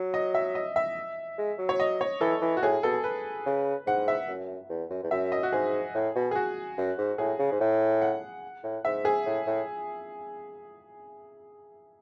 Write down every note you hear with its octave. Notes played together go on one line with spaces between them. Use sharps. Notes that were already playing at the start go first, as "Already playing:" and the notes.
Already playing: F#3
D#5
E5
D#5
E5
G#3
F#3
C#5
D#5
C#5
E3 A4
E3
F#4
A2 G#4
B2 A4
B4
C#3
G#2 F#5
E5
F#2
E2
F#2
E2
F#2 E5
D#5
F#4
G#2 G#4
A2
B2
G#4
F#4
F#2
G#2
A2 G#4
C#3
G#2
A2
F#5
A2
G#2 E5
G#4
A2
A2